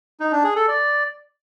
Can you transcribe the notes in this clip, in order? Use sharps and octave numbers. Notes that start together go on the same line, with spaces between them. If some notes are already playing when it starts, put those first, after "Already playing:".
D#4
D4
G#4
A4
D5